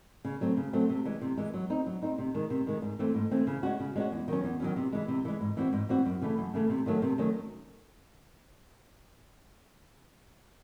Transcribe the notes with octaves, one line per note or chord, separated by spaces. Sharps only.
C#3
F#3 A3 C4
C#3
F#3 A3 C4
C3
E3 G#3
C3
E3 G#3
F#3
C4 D#4
F#3
C4 D#4
C3
D#3 G#3
C3
D#3 G#3
G#2
E3 A3 C4
G#2
E3 A3 C4
C#3
G#3 C#4 F#4
C#3
G#3 C#4 F#4
E2
D#3 F#3 C#4
E2
D#3 F#3 C#4
C3
E3 G#3
C3
E3 G#3
G#2
E3 C4 F#4
G#2
E3 C4 F#4
F#2
C#3 E3 A3
F#2
C#3 E3 A3
C3
D#3 F#3 A3 C#4
C3
D#3 F#3 A3 C#4